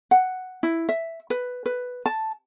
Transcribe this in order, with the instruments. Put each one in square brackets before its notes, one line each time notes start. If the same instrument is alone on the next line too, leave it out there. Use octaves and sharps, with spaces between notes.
[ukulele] F#5
E4
E5
B4
B4
A5